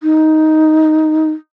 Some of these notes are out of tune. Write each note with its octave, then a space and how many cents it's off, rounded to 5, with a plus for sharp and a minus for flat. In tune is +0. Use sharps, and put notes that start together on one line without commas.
D#4 +5